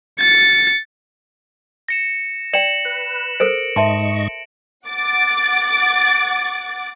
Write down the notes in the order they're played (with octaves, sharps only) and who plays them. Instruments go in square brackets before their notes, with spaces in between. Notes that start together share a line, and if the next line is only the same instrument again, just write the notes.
[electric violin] A6 C#7
[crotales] A#6 C#7 E7
[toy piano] D5 G5 [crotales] C#7 E7 F#7
[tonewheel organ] B4
[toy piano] A4 A#4 C5 [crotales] D7
[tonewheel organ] G#2 D#5 C#6 [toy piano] E5 A5 C6
[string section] F#5 D6 A6